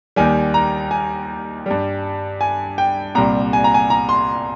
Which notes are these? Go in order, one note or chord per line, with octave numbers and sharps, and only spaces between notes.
D#2 D#3 G3 G#5
A#5
G#5
G2 G3
G#5
G5
C2 A#2 G3 A#5
G#5
A#5
G#5
A#5
C6